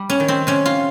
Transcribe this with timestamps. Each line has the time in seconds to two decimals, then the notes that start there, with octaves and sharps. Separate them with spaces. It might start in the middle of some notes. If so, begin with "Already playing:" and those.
Already playing: G3
0.10 C#4
0.20 D#3
0.28 C4
0.47 C3 C#4
0.66 F4